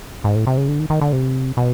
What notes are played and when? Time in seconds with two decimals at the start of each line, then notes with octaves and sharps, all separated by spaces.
0.24 G#2
0.35 A2
0.47 C3
0.58 C#3
0.68 D3
0.79 D#3
0.90 D#3
1.01 D3
1.13 C3
1.57 B2